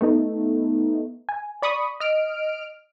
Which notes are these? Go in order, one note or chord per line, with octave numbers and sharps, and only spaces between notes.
A3 B3 D#4
G#5
D5 B5 C#6 D#6
D#5 F6 D7